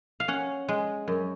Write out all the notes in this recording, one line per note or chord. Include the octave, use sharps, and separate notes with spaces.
F5
C#4 F#5
G#3
F#2